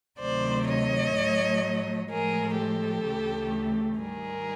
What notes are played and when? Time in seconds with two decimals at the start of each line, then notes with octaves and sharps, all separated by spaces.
0.20 D2 C3 D#3 F#3 A3 C5 D5
0.67 C#5 D#5
1.15 A2 F#3 A3
2.09 A2 F3 G#3 G#4 A#4
2.57 G4 A4
3.04 D2 C#3 E3 A3
3.99 G#2 D#3 G3 G#4 A#4